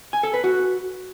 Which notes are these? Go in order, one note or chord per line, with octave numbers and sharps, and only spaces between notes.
G#5
A4
B4
F#4